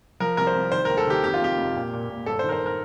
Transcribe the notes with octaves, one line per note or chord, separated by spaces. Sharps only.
F3 A#4
C2 A#4
C5
C2
D#3 C5
A#4
D#2
A4
D#3 G4
F2 G4
F4
F1 G4
F1
A#2
A#2
A#2
G1 A4
C5
D#3
A#4
C5
A#4